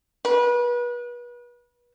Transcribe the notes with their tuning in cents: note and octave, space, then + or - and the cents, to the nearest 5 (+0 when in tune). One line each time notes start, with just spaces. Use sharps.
B4 -35